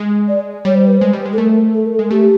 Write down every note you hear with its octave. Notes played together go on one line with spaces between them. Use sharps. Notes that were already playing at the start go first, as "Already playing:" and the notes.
Already playing: G#3
D5
G3 C#5
C5
B4
G#3 C5
G3
G#3
A4
A3 A#4
A4
A#4
A4
G#3
A3 G4